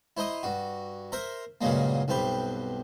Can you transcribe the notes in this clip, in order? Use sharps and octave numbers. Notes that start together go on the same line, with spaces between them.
E4 C5 D#5 A#5 D#6
G2 F#4
A#4 C5 E5 A#5
G2 A#2 C#3 F#3 G#3 A#3
B1 G2 C4 G4 B4